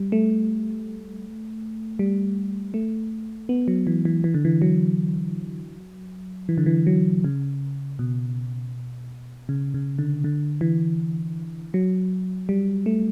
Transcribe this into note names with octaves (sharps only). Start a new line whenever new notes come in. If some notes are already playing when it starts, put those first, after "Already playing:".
Already playing: G3
A3
G3
A3
B3
F#3
E3
E3
E3
D3
E3
F#3
E3
D3
E3
F#3
C#3
B2
C#3
C#3
D3
D3
E3
F#3
G3
A3